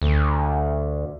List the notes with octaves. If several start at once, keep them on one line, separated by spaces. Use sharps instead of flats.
D2